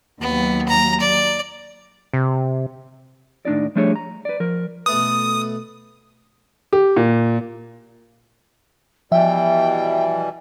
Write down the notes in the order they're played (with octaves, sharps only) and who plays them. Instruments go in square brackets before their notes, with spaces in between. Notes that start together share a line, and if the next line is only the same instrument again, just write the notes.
[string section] D#2 F#3 [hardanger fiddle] B3
[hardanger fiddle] A#5
D5
[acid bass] C3
[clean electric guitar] D#2 A2 D4 D#4 D5
F3 G3 A3 D4 G#4 C#5
A#5
B4 D5
F3 A#4
[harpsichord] B2 A3 B4 [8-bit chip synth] D#6
[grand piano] G4
A#2
[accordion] B2 E3 G3 [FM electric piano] F3 E5 [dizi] G5